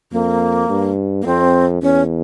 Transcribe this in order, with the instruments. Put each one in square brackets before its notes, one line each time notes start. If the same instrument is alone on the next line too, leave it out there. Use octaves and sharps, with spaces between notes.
[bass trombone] F2 [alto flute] A#3
[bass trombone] G2
[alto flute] A#3
[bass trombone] F2 [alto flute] C4
[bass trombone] E2 [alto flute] C#4